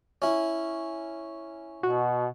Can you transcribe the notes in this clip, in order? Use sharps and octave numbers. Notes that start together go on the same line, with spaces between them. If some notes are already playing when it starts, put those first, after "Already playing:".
C#4 E4
B2 F#4